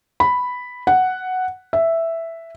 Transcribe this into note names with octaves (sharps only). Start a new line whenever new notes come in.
B5
F#5
E5